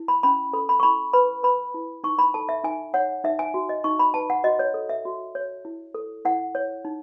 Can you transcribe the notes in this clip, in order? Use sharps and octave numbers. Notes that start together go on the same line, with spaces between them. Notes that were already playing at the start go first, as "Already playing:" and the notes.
Already playing: E4
B5
C#4 B5
A4 B5
B5
C#6
E4 B5
B4 B5
B4 B5
E4
D#4 C#6
B5
A4 A5
E5
D#4 G#5
C#5 F#5
D#4 E5
G#5
F#4
D#5
D#4 C#6
B5
B4 A5
F#5
F#4 D#5
C#5
A4
E5
F#4
C#5
E4
A4
E4 F#5
C#5
D#4